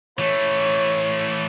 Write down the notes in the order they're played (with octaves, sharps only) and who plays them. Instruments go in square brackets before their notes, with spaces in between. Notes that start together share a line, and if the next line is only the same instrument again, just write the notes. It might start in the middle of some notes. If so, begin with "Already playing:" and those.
[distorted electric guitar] E3 A3 [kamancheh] C#5